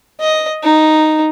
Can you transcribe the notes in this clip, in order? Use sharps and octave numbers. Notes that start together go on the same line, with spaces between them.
D#5
D#4